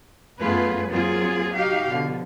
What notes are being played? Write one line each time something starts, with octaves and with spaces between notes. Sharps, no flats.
F#2 A3 B3 F4 G#4 B4
F#3 A#3 C4 F4 G#4
D#4 F#4 G4 F5
B2 D3 F3